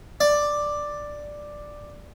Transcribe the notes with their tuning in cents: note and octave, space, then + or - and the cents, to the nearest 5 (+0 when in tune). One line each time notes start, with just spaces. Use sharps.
D5 +5